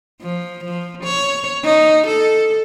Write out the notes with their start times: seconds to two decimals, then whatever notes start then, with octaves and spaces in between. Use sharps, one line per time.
0.21 F3
0.64 F3
1.04 C#5
1.64 D#4
2.07 A4